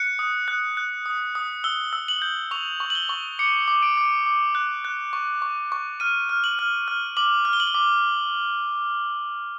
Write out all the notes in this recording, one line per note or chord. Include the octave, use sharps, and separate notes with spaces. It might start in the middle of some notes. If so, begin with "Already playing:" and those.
Already playing: F#6 C#7
D#6
F#6
F#6
D#6
D#6
E6 G7
E6
F#7
G6
C#6 F7
C#6
F#7
G7
C#6
D6 C#7
D6
D7
D6
D6
F#6
F#6
C#6
C#6
C#6
F6 D#7
F6
F#7
F6
F6
D6 F#7
F6
G7
F#7
G7
D6